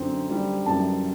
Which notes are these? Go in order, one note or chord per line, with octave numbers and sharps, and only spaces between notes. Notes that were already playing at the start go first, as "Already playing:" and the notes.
Already playing: F#2 D3 C4
G3
F#2 A5